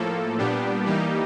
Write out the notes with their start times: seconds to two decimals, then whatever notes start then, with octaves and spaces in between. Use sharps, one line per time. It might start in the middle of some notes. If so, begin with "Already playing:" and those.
Already playing: A2 F3 A#3 A4
0.38 A#2 G3 B3 D4 G4
0.86 E3 G3 A#3 D#4 G4